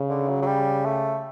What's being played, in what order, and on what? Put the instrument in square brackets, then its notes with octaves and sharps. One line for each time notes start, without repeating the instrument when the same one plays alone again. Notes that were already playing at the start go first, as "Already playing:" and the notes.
Already playing: [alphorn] C#3
[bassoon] D3
F#3
F#3
G3
A3